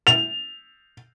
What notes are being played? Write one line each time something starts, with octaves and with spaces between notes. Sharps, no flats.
F7